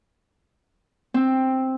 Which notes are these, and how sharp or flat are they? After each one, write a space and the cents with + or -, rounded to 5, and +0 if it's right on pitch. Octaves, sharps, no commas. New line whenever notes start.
C4 +5